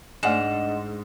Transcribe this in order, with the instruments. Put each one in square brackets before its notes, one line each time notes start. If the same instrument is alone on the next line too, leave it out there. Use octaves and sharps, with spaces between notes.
[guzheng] G#2 [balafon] A3 D5 G#5 [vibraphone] D4 D#5 [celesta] F#5 E7